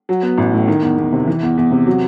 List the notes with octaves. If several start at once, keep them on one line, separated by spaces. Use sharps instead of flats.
F#3
B3
A1
A2
D#3
E2
E2
C3
E3
E2
E2
C3
F#3